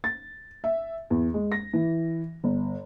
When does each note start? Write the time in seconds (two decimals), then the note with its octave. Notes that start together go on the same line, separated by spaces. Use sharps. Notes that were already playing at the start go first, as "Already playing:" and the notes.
0.04 A6
0.64 E5
1.10 E2
1.34 G#3
1.52 A#6
1.73 E3
2.44 G1